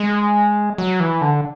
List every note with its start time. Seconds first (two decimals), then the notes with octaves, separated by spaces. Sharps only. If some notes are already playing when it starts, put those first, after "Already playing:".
Already playing: G#3
0.78 F#3
1.00 E3
1.21 D3